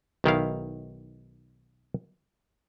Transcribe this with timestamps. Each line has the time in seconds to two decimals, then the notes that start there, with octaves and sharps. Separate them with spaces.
0.24 B1 D#3 E4 F5